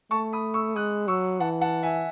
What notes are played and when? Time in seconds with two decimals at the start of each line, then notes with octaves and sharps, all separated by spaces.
0.11 A3 A5 C#6
0.33 B5 D#6
0.54 C#6 E6
0.76 G#3 D#6 F#6
1.08 F#3 C#6 E6
1.40 E3 F#5 A5
1.61 F#5 A5
1.83 E5 G#5